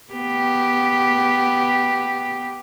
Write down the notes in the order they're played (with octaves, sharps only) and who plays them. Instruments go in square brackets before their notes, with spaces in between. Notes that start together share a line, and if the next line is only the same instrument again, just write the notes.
[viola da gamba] B3 G4